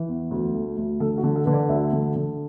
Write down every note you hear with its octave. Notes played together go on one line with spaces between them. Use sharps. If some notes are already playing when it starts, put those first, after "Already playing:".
Already playing: E3
E2
D2
A3
D2
D3 A4
F#4
D3
A4
D3 B4
D5
D2 E5
D3
D3